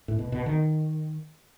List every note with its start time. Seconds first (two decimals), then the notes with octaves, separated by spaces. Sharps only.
0.08 A2
0.19 B2
0.32 B2
0.46 D#3